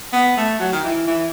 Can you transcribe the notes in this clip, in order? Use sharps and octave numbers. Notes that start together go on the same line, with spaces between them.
B3
A3
F#3
D#3
E3
E3